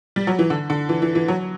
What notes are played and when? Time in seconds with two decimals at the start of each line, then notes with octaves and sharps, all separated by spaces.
0.16 G3
0.27 F#3
0.39 E3
0.50 D3
0.70 D3
0.89 E3
1.02 E3
1.15 E3
1.28 F#3